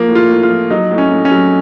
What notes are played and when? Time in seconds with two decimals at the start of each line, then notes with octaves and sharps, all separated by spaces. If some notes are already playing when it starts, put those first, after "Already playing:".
Already playing: F3 A#3
0.08 A2
0.15 F4
0.29 A2
0.43 F4
0.49 F3
0.70 F#3 D#4
0.91 A2
0.98 C#4
1.11 A2
1.25 C#4
1.31 F#3